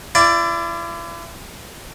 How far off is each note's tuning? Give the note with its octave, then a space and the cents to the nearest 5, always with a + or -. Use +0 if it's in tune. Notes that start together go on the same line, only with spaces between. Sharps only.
E4 +40 D5 +0